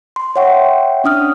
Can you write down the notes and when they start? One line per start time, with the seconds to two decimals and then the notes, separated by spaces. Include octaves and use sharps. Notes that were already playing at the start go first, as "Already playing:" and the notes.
0.16 C6
0.36 C#5 E5 F#5 G5 C#6
1.04 C#4 D4 D#6 F6